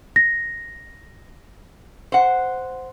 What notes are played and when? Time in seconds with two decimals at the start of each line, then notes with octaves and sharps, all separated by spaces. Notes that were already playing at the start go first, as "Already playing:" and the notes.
0.16 A#6
2.12 C5 F#5